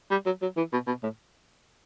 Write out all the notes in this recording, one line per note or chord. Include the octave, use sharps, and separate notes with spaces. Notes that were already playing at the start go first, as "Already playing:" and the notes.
G3
F#3
F#3
E3
B2
B2
A2